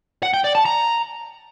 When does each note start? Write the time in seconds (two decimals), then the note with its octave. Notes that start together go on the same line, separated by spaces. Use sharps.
0.23 F#5
0.34 G5
0.44 D5
0.55 A5
0.66 A#5